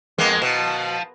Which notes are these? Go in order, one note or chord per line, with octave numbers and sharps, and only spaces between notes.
F2 G#3 A#3 B3
B2 F5 A5